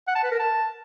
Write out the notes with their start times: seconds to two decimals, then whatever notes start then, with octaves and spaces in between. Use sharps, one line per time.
0.07 F#5
0.15 A5
0.23 B4
0.31 A#4
0.39 A5